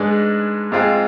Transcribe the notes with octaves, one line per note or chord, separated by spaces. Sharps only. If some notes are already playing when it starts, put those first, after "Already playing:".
Already playing: G#2 G#3 D4 G#4 B4
G#2 G#3 C4 F4